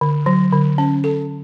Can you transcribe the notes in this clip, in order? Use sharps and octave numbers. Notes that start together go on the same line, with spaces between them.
D3
F#3
D3
C#4
A4